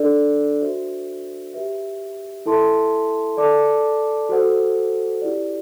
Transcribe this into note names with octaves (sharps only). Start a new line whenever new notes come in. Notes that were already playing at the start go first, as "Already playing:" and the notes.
Already playing: D4 A4 D5
F#4 C5 E5
G4 B4 E5
E4 A4 E5 A5 C6
A4 D5 A5 D6
F#4 A4 C5 F#5
E4 G4 D5